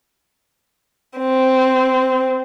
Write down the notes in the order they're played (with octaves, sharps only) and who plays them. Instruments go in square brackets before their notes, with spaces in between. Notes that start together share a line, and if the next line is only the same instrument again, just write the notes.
[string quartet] C4